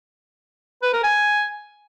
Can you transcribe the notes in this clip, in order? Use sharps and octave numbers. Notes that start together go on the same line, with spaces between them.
B4
A#4
G#5